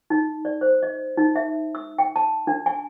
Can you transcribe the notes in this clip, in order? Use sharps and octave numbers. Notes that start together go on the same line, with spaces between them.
D#4
D5
C5
D#5
D#4
E5
E6
G5
A5
D4
G#5